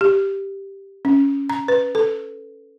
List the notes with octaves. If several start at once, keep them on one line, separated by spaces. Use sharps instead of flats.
G4
C#4
A#5
B4
A4